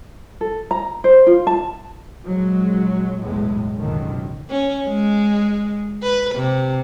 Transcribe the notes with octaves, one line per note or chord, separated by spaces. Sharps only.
A4
A#5
C5
F4
A5
A#1 F#3 G#3
B1 E2 A2 G#3
F#1 C#2 F#2 B2 D3 D#3
C#4
G#3
B4
C3